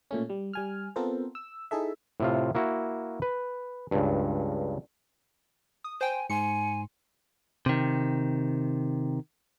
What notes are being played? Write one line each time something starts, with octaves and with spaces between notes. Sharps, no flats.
A#2 A3 C#4
G3
G3 G#5 F6
B3 C4 F4 A4 A#4 C5
E6
D#4 E4 G#4 A4 E5
A2 C3 F4
A#3 E4 F#4
B4
C#2 G2
D#6
C5 G5 G#5
G#2 G#5 C6 C#7
C3 D#3